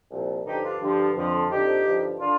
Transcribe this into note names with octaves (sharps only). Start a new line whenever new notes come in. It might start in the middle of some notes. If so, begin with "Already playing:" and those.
C2 A#2 F3
G2 D3 F3 D#4 G4
D4 F4
G2 D3 F3
F2 D3 F3
F2 D3 F3 D#4 G4
G2 D3 F3
D3 D4 F4